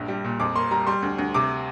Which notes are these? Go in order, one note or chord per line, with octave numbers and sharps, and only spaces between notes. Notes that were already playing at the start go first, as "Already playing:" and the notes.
Already playing: A#1 G2
G3
A#2
F2 D6
A#3 C6
G3 A#5
G3 C6
D2
D2
C3 D6